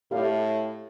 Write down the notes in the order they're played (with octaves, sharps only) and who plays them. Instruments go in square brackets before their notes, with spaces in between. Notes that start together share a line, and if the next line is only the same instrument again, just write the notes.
[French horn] A2 [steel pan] G4 D5 F5